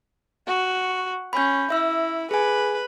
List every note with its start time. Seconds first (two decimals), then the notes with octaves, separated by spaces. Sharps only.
0.47 F#4
1.33 C#4 B5 G6
1.70 E4 E5 E6
2.31 G#4 B4 G#5